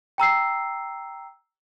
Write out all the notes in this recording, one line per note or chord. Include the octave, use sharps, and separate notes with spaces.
G5 A#5 E6 C7